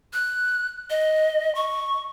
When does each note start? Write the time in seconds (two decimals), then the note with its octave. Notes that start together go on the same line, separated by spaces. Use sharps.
0.13 F#6
0.90 D#5
1.55 C#6